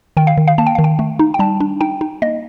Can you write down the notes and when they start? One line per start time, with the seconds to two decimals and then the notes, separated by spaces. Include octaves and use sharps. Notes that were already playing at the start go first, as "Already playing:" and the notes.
0.17 D#3 G5
0.27 F5
0.37 D#3
0.47 F5
0.58 A#3 A5
0.67 G5
0.75 D#3 F5
0.84 G5
0.99 A3
1.19 D#4
1.34 G5
1.39 G3 A5
1.60 D4
1.81 D#4 G5
2.01 D#4
2.22 A#3 D#5